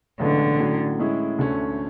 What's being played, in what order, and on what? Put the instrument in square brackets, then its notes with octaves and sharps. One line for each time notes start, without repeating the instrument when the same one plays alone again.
[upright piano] B1 A2 E3 G#3 C#4 [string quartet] D3
[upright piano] A2 F#3 C#4
A2 G#3 C#4 E4
D2 D3 A3 C#4